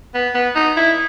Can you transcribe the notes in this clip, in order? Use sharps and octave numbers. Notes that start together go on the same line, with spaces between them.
B3
B3
D#4
E4